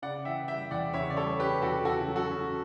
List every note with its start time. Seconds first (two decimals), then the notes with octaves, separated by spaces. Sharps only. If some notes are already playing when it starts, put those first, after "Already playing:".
0.02 C#3 D5 F#5
0.25 E3 E5 G5
0.48 G3 E5 G5
0.71 E2 D5 F#5
0.94 C#3 C#5 E5
1.10 D5
1.17 G3 A4 C#5
1.40 C#4 G4 B4
1.62 E2 F#4 A4
1.85 C#3 F#4 A4
2.00 F#4
2.08 F#3
2.16 F#4 A4
2.31 C#4